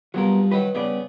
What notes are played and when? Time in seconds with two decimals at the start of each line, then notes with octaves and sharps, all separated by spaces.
0.14 C2 F3 F#3 B3 A#4
0.52 D#3 F#3 B4
0.75 G2 C#3 B3 D5